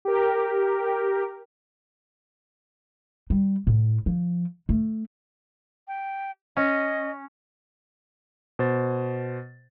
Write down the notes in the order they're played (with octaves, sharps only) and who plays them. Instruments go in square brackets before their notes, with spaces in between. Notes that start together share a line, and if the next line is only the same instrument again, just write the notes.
[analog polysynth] G4 A#4
[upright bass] G3
A2
F3
A3
[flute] G5
[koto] C#4 [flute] D#5
[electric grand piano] B2 C5 A6